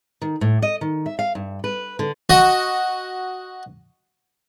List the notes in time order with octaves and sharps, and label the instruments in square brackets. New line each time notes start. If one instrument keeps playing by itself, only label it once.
[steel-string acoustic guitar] D#3
A2
D#5
D#3
E5
F5
G2
B4
D3
[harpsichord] F#4 D#5